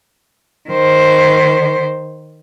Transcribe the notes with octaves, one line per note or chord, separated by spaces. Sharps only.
D#3 C5